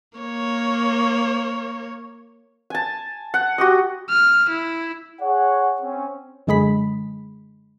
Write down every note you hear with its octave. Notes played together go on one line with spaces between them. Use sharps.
A#3 C#5
G#5 A5
F#5
F#4 G4 D#5
F6
E4
G#4 C#5 F#5
C4 C#4
F#2 D3 G#3 G#4 B5 B6